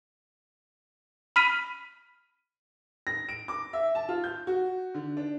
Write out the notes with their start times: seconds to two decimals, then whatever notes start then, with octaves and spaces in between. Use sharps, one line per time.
1.36 B5 F6 B6 D#7
3.07 A#6
3.29 D7
3.48 D6
3.73 E5
3.95 A5
4.09 F4
4.24 G6
4.47 F#4
4.94 D3
5.17 D4